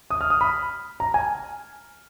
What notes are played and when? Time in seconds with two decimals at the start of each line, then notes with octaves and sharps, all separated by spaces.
0.10 D#6
0.21 F6
0.30 D#6
0.41 B5
1.00 A#5
1.14 G#5